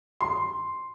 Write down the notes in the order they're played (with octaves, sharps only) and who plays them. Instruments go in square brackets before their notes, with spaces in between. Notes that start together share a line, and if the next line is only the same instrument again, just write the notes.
[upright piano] C6